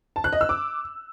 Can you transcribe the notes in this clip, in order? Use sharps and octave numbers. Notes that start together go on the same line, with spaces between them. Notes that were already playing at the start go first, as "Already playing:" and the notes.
A5
F#6
D#5
E6
D6